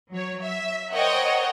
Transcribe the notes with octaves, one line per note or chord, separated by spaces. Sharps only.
F#3 C#5
E5
A#4 C5 C#5 D#5 F#5 G5